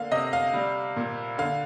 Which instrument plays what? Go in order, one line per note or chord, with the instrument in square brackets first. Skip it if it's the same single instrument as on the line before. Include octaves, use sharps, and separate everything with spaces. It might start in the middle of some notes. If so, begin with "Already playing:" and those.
Already playing: [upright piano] D3 A#3 F5
C3 D#5
F5
G3
A#2
D3 F5